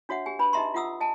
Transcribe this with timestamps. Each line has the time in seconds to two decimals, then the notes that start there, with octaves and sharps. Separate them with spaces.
0.09 D4 F#4 C#5 E5 F#5
0.26 G4 G#5
0.39 D4 B4 B5
0.53 D#4 G4 D#5 E5 A#5 C6
0.74 F4 E5 F#5 D#6 E6
1.00 D#5 G#5 A5